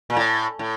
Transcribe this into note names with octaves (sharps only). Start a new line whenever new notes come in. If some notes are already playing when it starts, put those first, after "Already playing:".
A#2
A2
A2